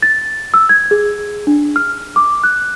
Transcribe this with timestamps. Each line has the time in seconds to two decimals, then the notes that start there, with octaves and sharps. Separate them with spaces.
0.02 A6
0.54 E6
0.69 G#6
0.91 G#4
1.47 D4
1.76 F6
2.16 D6
2.44 F#6